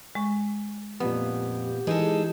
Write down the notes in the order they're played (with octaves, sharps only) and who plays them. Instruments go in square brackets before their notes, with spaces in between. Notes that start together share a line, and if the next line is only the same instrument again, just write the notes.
[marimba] G#3 C#6
[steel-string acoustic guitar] F2 [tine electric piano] A#2 B3 [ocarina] G4
[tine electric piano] E3 G#4 [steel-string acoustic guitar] G#3 D#4 A4